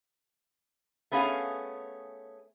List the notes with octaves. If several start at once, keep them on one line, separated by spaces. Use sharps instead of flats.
A3 B3 C#4 G#4 F5